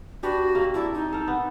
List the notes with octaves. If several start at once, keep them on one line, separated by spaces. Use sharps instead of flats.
D4 F#4 G4 B4
C3 A#3
A3 E4 D5
D#4
A4 A#4
B3